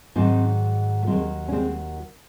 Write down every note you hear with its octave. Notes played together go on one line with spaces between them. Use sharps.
G#2 D#3 F#3 C4 D#4
A3
D#2 D#3 F#3 G#3 C4
C#4
G#3 C4